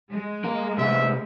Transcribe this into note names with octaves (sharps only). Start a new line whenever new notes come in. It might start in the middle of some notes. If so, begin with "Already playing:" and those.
G#3
A#3 A#4
C3 A#3 C5 E5